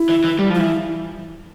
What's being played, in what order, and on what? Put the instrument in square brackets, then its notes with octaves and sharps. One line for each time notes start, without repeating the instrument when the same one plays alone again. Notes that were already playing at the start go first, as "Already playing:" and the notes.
Already playing: [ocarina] E4
[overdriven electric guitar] E3
E3
G3
F3
[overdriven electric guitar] E3 [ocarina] E4